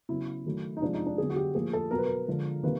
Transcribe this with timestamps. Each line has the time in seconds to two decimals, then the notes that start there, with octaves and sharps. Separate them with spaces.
0.09 C#3 F#3 B3 E4
0.45 D#3 F#3 A3
0.77 D#4
0.82 C3 F3 G#3 D4
0.94 D#4
1.06 D4
1.18 D3 F#3 B3 G#4
1.30 F#4
1.36 G4
1.54 A2 F3 A#3 G#4
1.73 A4
1.91 B2 F#3 B3 A#4
1.98 B4
2.07 A#4
2.27 D3 F3 G#3
2.63 C3 D#3 G3 A#3 B4